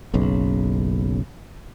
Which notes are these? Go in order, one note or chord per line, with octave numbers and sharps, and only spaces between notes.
F#1 B1 C#3